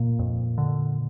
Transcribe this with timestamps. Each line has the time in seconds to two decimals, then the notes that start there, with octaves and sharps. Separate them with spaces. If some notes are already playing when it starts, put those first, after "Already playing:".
Already playing: A#2 A#3
0.19 F2
0.58 D3